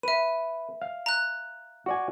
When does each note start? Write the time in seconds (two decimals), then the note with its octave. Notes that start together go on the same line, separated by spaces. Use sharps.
0.03 B4 E5 D#7
0.82 F5
1.06 A#5 F#6
1.86 F#4 D5 G#5